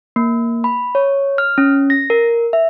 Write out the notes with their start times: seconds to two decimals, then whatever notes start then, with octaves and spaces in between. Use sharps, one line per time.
0.16 A#3
0.64 B5
0.95 C#5
1.38 F6
1.58 C#4
1.90 A#6
2.10 A#4
2.53 E5